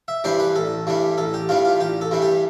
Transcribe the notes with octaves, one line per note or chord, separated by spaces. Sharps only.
E5
G2 E3 G3 D4 C5
B4
A1 A4
G2 E3 G3 D4
A1 A4
G4
G2 E3 G3 D4 F4
F4
A1 G4
A4
G2 E3 G3 D4
G4